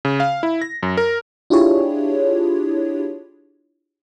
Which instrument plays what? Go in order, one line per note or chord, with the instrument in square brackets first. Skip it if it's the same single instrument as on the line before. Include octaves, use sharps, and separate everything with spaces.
[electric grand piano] C#3
F5
E4
A#6
F#2
A#4
[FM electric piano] D4 E4 F4 G4 G#4 C#5